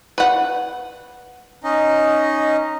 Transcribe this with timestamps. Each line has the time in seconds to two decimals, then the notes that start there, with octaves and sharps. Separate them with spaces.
0.18 B4 F#5
1.64 C#4 D#4 D#5